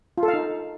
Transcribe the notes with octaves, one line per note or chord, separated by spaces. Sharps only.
F4
A4
F5
D#4